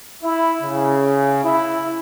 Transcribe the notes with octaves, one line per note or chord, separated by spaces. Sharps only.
E4
C#3
E4